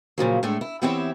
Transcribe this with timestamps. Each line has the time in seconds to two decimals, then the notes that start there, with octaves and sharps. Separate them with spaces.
0.18 A#2 C#3 F3 F#3
0.43 A2 G#3 A3 D4
0.61 E4
0.82 E3 B3 C4 E4 G4 C#5